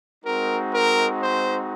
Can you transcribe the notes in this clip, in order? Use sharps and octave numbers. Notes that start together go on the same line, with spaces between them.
G#3 C4 D#4 F#4 A#4
A#4
C5